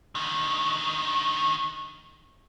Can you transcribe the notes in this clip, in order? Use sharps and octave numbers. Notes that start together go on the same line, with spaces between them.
D3 D#3